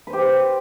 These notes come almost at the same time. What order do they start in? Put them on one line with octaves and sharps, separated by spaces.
B4 C5 G4